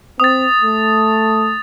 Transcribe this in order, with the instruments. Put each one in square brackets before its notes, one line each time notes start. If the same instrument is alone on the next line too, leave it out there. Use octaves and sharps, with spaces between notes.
[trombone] C4 [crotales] D#6 A6
[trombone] A3